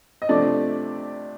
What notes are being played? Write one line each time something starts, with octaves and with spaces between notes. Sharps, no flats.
D#5
C3 F3 A3 D4 D5